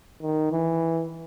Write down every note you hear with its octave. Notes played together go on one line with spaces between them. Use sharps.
D#3
E3